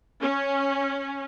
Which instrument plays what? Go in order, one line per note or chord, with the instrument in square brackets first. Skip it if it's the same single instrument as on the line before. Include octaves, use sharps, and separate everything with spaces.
[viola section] C#4